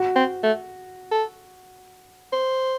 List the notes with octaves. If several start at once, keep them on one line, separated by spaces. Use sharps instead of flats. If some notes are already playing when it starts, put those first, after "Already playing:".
Already playing: F#4
C4
A3
A4
C5